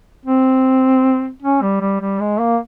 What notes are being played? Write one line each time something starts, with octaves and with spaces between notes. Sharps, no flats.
C4
C#4
G3
G3
G3
G#3
A#3